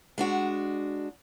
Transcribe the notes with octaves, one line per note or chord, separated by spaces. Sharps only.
G#3 D4 F#4